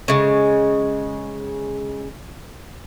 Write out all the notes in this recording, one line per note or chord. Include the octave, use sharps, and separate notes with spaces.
C#3 G#3